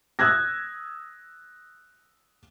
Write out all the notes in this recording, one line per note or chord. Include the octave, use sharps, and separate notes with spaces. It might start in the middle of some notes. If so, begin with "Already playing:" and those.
D#6 E6 F#6 G#6 A#6